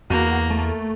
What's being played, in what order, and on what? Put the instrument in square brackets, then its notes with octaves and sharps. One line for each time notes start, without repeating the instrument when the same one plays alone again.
[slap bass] E2 [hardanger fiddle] A#3 [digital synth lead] F#4
[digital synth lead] A3